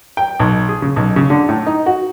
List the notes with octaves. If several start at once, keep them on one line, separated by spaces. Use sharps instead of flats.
G5
B1
G#4
C#3
B1
C#3
D3
A2
D#4
F#4